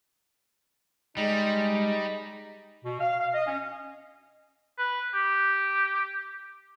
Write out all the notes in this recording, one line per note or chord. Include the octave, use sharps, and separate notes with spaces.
G3 G#3 D#4
B2
F5
F5
D#5
C#4
B4
G4